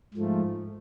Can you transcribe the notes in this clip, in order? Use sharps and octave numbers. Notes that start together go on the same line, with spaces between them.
G#2 F3 A3